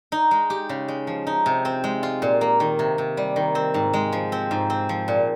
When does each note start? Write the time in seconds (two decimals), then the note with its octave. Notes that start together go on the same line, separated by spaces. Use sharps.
0.12 D#4
0.31 G#3
0.50 G4
0.69 C#3
0.88 G#3
1.07 F3
1.27 D#4
1.46 C3
1.65 C4
1.84 G#3
2.03 F4
2.22 A#2
2.41 A#3
2.60 D#3
2.79 C3
2.98 C3
3.17 G3
3.36 D#3
3.55 C4
3.74 G#2
3.94 G#3
4.12 F3
4.32 C4
4.51 G#2
4.70 C4
4.89 F3
5.08 A#2